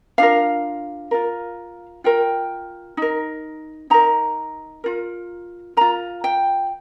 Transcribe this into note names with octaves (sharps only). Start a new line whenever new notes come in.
D4 F4 A#4 F5
F4 A#4
F4 A#4 G5
D#4 A#4
D#4 A#4 A#5
F4 A#4
F4 A#4 A#5
G5